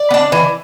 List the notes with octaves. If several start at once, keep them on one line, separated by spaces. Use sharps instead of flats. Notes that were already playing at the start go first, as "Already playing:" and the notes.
Already playing: D5
B3
D4
E3